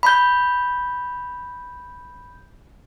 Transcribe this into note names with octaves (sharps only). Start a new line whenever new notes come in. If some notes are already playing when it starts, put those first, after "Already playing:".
B5 G6